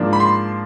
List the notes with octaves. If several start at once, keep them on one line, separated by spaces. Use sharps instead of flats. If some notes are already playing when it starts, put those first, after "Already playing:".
Already playing: G#2 F3 A#3 D4
B5
C6